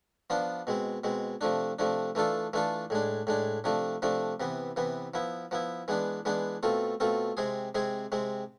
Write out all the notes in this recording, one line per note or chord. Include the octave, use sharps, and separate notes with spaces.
F3 B3 D4 F4
B2 G#3 C4
B2 G#3 C4
C3 F3 A3 D4
C3 F3 A3 D4
E3 A3 D4 F4 A4
E3 A3 D4 F4 A4
A2 G#3 D4
A2 G#3 D4
C3 F3 A3 D4
C3 F3 A3 D4
C3 E3 B3
C3 E3 B3
F3 B3 E4
F3 B3 E4
E3 G#3 B3 D4
E3 G#3 B3 D4
B2 A3 C4 F4 A4
B2 A3 C4 F4 A4
C3 G#3 C4 G#4
C3 G#3 C4 G#4
C3 G#3 C4